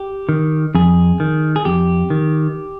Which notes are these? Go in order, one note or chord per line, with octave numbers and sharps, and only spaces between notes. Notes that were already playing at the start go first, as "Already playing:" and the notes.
Already playing: G4
D#3
F2 G#4
D#3
G#4
F2 G4
D#3